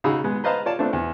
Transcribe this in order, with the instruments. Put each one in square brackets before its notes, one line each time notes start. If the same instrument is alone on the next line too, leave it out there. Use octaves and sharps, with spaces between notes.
[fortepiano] C#3 D#4 F#4 G#4 B5 E6
G#3 B3
B4 C5 D#5 F5 A5 A#5
F4 C#5 D5 A5
A3 B3 C4 D4 F4
E2